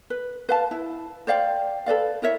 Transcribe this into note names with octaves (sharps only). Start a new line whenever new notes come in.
B4
B4 F5 A5
E4
C5 D5 F5 G5
A4 B4 D5 F5
E4 A#4 C#5 E5